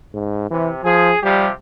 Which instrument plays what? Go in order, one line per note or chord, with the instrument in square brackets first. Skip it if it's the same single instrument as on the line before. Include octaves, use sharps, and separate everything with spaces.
[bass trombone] G#2
[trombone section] C3 [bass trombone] E3
[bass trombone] F3 [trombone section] G#4
[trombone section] C3 F3 G4 [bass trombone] G3